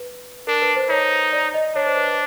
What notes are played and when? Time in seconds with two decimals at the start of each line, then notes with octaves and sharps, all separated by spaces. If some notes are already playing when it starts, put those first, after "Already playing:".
Already playing: B4
0.47 D4 A#4
0.62 B4
0.76 C5
0.90 D#4 C#5
1.33 D5
1.54 D#5
1.75 D4 C#5
1.86 C5
1.97 B4
2.07 B4